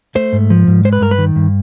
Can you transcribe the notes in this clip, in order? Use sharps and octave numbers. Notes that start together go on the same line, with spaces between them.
A3 C5
G#2
F3
G#2
G#3 C5
B4
G2 A#4
B4
D#3
G2